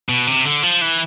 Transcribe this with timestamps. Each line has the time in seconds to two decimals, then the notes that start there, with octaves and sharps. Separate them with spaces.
0.09 B2
0.27 C3
0.45 D3
0.63 F3
0.81 E3